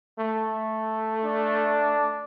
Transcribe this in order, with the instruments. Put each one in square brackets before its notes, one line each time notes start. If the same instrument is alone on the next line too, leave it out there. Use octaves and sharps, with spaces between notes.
[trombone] A3
[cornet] D4